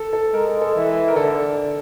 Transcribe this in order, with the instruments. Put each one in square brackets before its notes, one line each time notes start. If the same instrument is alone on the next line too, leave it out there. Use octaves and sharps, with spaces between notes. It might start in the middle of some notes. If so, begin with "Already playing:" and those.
Already playing: [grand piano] A4
A4
[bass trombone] G#3 [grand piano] A#4
[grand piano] A4
A4
[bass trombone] E3
[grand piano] A#4
[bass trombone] D3 [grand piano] A4